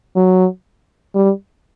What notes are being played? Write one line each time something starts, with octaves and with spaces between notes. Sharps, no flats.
F#3
G3